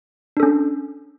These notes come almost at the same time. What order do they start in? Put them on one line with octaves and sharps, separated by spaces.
D4 A4 C#4